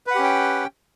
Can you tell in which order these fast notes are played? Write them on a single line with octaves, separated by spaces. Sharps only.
B4 F#5 G4 C#4 G5